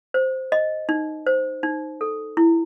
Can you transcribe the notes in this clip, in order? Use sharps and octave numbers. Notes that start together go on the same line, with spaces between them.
C5
D#5
D#4
C5
D#4
A4
E4